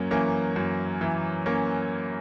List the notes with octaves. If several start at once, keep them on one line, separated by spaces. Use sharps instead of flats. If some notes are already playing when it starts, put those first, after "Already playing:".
Already playing: F#2 A#3 C#4
E3 A#3 C#4
F#2
E3
A#3 C#4